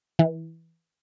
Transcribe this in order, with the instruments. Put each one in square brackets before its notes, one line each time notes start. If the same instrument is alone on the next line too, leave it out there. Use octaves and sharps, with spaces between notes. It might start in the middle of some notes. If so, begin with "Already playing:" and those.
[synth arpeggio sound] E3